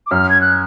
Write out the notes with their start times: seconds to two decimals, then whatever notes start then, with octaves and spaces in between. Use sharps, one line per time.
0.07 D6
0.11 F#2 F6
0.30 G#6
0.41 F#6